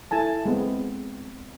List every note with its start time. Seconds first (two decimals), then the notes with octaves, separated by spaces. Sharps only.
0.11 E4 A4 G#5 A5
0.46 G#3 B3 C4